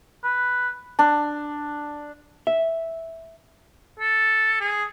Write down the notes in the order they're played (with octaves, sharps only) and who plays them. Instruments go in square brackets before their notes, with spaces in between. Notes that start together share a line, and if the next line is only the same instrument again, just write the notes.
[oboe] B4
[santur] D4
[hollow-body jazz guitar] E5
[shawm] A4
G#4